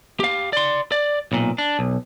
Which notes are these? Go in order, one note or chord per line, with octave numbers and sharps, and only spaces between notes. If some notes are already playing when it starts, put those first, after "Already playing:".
G4 F5
D5 C6
D5
B1 A#2
D4
B1